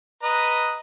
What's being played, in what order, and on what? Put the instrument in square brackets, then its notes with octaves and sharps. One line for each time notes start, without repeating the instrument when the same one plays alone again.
[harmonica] B4 D#5 A#5